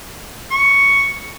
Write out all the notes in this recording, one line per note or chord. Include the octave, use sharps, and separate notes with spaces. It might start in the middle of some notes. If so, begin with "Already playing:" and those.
C#6